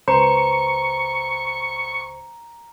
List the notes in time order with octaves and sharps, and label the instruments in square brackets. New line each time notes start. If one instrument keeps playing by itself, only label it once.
[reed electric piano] C#2 C5 [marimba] B4 [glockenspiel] A#5 [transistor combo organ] C#6